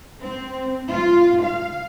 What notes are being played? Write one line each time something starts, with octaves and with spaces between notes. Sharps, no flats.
C4
F4
F5